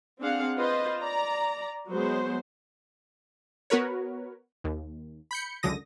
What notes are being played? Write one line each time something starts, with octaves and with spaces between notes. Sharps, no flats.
C4 D4 G#4 F5 F#5
F4 B4 C5 D#5
D5 A#5
F#3 G#3 B3 C5
B3 F#4 A#4 B4 C#5
D#2
B5 G6 C#7
C#2 F#2 D3 D#6 A#6